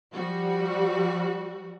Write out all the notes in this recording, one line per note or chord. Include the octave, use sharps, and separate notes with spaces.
F3 G3 F#4